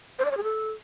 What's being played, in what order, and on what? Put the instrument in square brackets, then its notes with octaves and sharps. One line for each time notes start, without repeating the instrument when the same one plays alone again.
[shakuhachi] C5
D5
C#5
G#4
A4